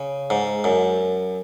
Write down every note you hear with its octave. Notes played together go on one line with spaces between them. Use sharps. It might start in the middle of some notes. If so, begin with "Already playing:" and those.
Already playing: C#3
G#2
F#2